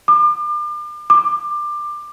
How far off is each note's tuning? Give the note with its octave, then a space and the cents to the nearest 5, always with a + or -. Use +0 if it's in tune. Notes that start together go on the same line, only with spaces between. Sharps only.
D6 +35
D6 +20